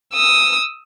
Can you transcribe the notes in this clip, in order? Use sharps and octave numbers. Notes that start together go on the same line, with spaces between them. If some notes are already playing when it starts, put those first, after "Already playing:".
D#6 E6